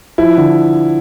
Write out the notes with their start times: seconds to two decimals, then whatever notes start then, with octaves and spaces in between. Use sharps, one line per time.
0.18 F3 E4
0.38 D3